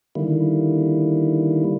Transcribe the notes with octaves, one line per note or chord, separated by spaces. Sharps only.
D3 D#3 G3 A#3 E4